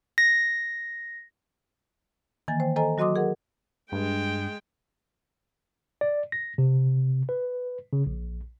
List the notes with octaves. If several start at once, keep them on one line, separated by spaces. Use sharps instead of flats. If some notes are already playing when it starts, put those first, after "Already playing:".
A#6
D#3 E3 A#3 G#5 A6
C5 G5
A4 C5 D#5 G#5 A#5
F#3 F#4 D#5 C6 D6 D#6
G#4 A#4 F#5
G2 G#3 G5
D5
A#6
C3
B4
C#3
A#1